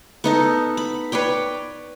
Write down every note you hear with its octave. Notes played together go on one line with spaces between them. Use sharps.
B3 D#4 A4
B5
B4 C#5 D5 G5